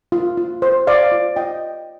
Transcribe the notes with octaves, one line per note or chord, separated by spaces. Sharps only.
F4
F4
C5
C5 D5 F5
F4
F4 D#5 G5